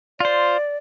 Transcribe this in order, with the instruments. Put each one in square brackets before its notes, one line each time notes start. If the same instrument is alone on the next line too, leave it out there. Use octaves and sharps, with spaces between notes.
[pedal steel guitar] F4 C5 [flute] D5